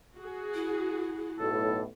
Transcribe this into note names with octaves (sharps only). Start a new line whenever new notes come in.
F#4 G#4
E4
B1 A2 A4